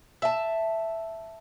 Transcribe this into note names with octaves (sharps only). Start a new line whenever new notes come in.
E5 A5